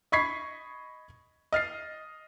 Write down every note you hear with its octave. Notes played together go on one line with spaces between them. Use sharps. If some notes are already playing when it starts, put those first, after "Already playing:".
D#5 B5 C#6 G#6 B6 C7
D#5 F6 A6 C7